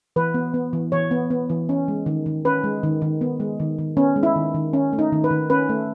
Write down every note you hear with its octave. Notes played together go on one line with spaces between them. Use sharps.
E3 B4
B3
B3
E3
E3 C#5
B3
B3
E3
C#4
G#3
D#3
D#3
C#4 B4
G#3
D#3
D#3
B3
G#3
D#3
D#3
B3 C#4
G#3
E4
D#3
D#3
C#4
A3
D#4
D#3
B4
D#3
C#4 B4
A3